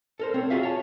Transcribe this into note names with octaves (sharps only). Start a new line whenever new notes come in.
A4 A#4 C5
C4 C#5
F4 F#4 G#4 E5 F5
C#5 A5